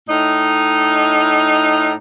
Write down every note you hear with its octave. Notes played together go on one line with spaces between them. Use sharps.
A2 D#4